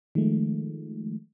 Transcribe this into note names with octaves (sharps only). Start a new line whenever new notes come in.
D#3 F3 G#3 A3